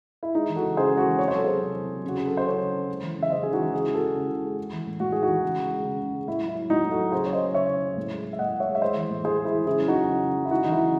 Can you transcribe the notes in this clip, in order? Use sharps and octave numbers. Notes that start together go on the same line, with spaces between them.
E4
G#3 D#4
E3
F#4 A4
C#3
C#3 G#4 C5
G#3
F#4 A4
E3
C3 C#5
C5
F#3 A4
F#3 G#4 C5
C3
C3
F#3
C#3 F#4
F#3 G#4
A4
F#3
C5
C#3 A4 C#5
C#3
F#3
G#3
E3
C#3
E5
C#3 C5 D#5
G#3 G#4
D#4 F#4
E3
C#3 E4 G#4
G#3
F#4 A4
G#3
C#3
C#3
G#3
G#3
E3
A2
A2 F#4
G#3 G#4
D#4 F#4
E3
C#3
G#3
G#3
C#3
C#3
G#3
A2 E4
F#3
E4
F#3
A2 D#4 F#4
A2
F#4 A4
F#3
C#3 G#4 C5
F#3 C#5
C5 D#5
F#3
C#3 C#5 E5
C#3
F#3
A2
G#3
G#3
E5
A2 D#5 F#5
A2
C#5 E5
G#3
E5
G#3 C5 D#5
E3
A2
A2 G#4 C5
G#3
E4 G#4
E3
C#3 E4 G#4
F#3
D#4 F#4
F#3
C#3
C#3
F#3
E4
G#3 D#4 F#4
E3 D#4
E4
C#3